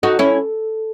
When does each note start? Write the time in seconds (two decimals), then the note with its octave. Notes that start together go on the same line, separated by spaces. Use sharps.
0.03 D#4 F#4 A4
0.19 C#4 E4